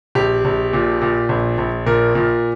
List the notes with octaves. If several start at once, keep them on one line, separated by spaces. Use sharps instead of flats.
A#1 G4
A#1
A#2
A#2
A#1
A#1
A#2 A#4
A#2